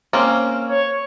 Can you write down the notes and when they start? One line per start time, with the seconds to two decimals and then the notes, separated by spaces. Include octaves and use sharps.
0.13 A#3 C4 C#4
0.69 C#5